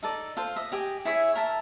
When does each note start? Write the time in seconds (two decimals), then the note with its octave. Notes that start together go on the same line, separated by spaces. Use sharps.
0.03 D#4 A4 D5
0.37 F4 A4 C5
0.56 D#5 E5
0.72 G4 G#4 D#5
1.05 E4 G#4 C#5 E5
1.35 A#4 E5 A5